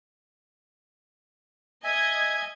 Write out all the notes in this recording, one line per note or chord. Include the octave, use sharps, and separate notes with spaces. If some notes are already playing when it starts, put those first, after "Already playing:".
D#5 E5 G#5 G#6